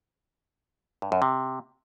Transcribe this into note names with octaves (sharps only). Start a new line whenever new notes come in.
G2
F#2
C3